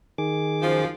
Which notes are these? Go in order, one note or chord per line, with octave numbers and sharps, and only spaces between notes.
D#3 G#4 D6
F#2 F3